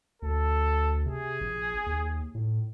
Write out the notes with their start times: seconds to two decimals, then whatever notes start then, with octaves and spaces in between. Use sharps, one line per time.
0.22 D2 A4
1.06 C3 G#4
1.41 A#1
1.86 D#2
2.35 A2